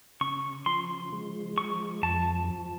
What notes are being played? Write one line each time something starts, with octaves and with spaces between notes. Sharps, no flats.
C#3 C#6
F3 C6
G#3
F3 C#6
F2 A5
F3